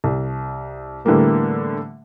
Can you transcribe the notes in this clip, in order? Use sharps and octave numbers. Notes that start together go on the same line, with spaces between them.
C2
A2 D3 E3 G3 A#3 B3